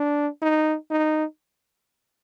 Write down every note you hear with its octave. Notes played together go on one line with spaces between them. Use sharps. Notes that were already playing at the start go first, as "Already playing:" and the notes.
Already playing: D4
D#4
D#4